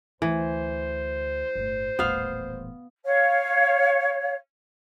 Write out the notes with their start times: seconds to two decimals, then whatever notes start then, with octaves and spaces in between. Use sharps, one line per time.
0.22 D2 E3 C5
1.55 G1 A2
1.99 D#1 A1 B3 F5
3.04 C#5 F5